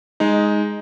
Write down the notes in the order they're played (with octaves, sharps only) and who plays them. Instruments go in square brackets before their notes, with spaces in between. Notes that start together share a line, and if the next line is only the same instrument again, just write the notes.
[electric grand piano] G#3 D#4